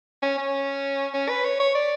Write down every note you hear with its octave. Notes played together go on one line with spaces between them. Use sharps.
C#4
C#4
C#4
B4
C#5
C#5
D5